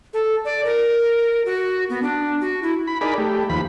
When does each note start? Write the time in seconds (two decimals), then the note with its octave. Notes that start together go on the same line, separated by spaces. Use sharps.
0.14 A4
0.45 D5
0.65 A#4
1.45 F#4
1.90 B3
2.02 D4
2.41 F#4
2.63 E4
2.87 B5
3.01 D#4 G#4 A#4 D5 B5
3.18 A3 G4
3.50 D#2 F3 B5